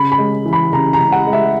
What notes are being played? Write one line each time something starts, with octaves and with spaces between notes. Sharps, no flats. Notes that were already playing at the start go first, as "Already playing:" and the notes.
Already playing: C#3 B5
B5
G#3
E3
B5
C#3 A#5
A#5
C#3
F#5
G#3
E5